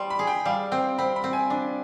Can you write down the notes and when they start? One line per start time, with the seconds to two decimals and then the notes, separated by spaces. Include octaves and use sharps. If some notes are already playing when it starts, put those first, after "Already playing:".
Already playing: G3 C6
0.10 B5
0.19 G#4
0.27 G5
0.46 G3 F5
0.71 C4 G5
0.98 C4 B5
1.16 B5
1.24 C4
1.33 G#5
1.50 D4